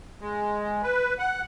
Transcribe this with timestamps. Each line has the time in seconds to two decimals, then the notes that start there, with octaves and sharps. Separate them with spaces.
0.21 G#3
0.83 B4
1.19 F#5